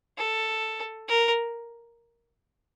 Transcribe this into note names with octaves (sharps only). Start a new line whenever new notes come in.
A4
A#4